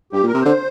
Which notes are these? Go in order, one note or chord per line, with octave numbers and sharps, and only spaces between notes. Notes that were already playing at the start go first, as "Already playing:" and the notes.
G2 G4
A#2 A#4
C3
D3 C5